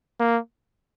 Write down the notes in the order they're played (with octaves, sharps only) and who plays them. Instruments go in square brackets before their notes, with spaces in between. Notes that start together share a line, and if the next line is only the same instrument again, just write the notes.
[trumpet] A#3